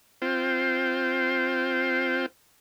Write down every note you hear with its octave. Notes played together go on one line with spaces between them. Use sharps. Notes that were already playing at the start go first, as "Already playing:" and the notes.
C4 F4 C5 G5